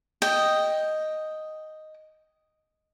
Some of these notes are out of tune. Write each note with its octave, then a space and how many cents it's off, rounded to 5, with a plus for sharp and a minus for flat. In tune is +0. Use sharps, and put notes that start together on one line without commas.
D#5 +0 G5 +0